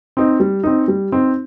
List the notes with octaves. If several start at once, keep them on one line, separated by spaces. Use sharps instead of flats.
C4 D#4
G3
C4 D#4
G3
C4 D#4